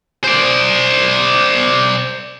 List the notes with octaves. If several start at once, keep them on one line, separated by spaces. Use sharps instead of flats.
C5 D5